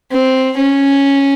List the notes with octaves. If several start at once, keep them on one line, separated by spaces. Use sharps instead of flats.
C4
C#4